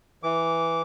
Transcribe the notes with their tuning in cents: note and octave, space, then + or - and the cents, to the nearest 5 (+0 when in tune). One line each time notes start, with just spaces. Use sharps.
E3 +0 D6 -20